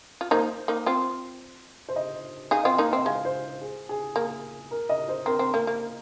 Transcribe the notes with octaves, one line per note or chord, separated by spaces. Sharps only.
F4
A#3 D#4 C5
A#3 D#4
C4 F4
C5
D#5
D#4 G#4 F5
C4 F4 D#5
A#3 D#4 F5
C4 D#5
G#3 F5
C5
G#4
G#4
A#3 G#4
A#4
D#5
C5
C4 A#4
C4
A#3
A#3